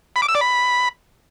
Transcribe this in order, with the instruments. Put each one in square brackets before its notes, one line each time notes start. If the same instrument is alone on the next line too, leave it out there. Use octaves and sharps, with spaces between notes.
[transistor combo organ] B5
D6
E6
D5
B5